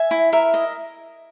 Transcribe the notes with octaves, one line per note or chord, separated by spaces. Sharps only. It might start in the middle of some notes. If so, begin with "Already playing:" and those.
Already playing: E5 G#5
E4
A#4 E5
D#5